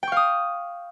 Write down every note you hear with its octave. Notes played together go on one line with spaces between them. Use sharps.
F5 G5 C#6 D#6